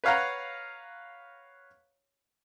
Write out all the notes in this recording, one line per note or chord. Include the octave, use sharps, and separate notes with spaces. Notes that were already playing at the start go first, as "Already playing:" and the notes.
B4 C#5 F5 F#5 A#5